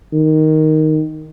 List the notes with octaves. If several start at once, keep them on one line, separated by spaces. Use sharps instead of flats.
D#3